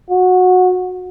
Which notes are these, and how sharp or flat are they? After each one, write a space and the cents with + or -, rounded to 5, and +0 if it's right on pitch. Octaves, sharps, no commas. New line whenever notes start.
F#4 -15